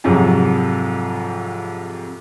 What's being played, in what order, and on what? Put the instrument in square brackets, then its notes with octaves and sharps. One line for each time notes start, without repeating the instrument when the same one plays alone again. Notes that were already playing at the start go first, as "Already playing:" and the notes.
[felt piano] F2 G#2 C3 F#3